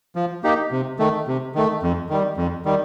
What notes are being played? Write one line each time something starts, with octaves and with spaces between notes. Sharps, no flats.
F3
A#3 D#4 G4
C3
D#3 A3
C3
D#3 A3
F2
D#3 G3
F2
D#3 G3